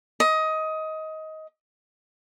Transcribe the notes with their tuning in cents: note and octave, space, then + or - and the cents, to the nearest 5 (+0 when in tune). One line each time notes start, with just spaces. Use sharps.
D#5 +20